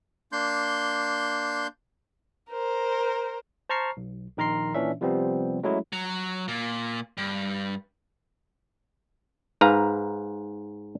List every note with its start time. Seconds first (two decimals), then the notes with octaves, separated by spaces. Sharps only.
0.32 A#3 D4 C6 G6
2.51 A#4 C5
3.69 C5 A5 A#5 C#6 F6 C7
3.97 B1
4.37 A#1 D#3 A#4 A#5 C6 C7
4.74 A#2 E3 C#4 D4 E5
5.01 C3 F3 G3 B3 C4
5.63 F#3 G#3 A3 C#4 E4 G#4
5.93 F#3
6.48 A#2
7.17 G2
9.61 G#2 B4 F5 A#5